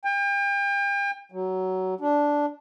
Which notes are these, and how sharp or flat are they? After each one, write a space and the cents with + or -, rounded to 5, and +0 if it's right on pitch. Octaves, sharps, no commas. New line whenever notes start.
G5 +40
F#3 +15
D4 -5